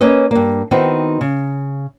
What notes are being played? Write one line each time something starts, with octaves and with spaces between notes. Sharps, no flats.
A#3 C#4 B4 C#5 D#5
G2 A#3
D#3 B3 C4 D#4 E4 F#4
C#3